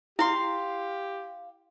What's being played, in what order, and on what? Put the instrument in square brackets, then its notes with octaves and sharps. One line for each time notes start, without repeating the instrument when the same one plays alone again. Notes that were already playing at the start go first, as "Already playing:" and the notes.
[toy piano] E4 [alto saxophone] G4 [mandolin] F5 C6